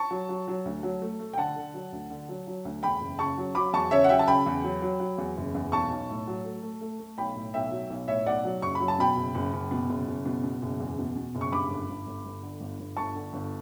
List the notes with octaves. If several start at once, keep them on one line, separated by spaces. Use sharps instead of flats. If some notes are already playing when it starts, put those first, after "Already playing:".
Already playing: A5 C#6
F#3
F#3
F#3
D2
F#3
A3
A3
G5
D3 F#5 A5
D3
F#3
D2
D3
F#3
F#3
D2
E2 G5 B5
F#1
C#3 A5 C#6
F#3
F#3 B5 D6
E2 A5 C#6
C#3 C#5 E5
F#5
F#3 E5 G5
A5
C#3 G5 B5
E2
F#3
F#3
F#3
E2
F#1
E2
B1 A5 C#6
B1
A2
F#3
A3
A3
A3
A3
B1 G5 B5
A2
B1 E5 G5
F#3
B1
A2 C#5 E5
B1 D5 F#5
F#3
F#1 C#6
B5
F#3
A5
B2 G5 B5
F#1
F#1
F#1
B2
F#1
F#1
B2
B2
F#1
E2
B2
B2
F#1
C#6
G2 B5 D6
G1
G1
G1
G1
D3
G1
G1
G1 A5 C#6
D3
G1